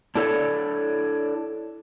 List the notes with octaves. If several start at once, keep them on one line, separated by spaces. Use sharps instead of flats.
D4 E4 A4 C#5 D5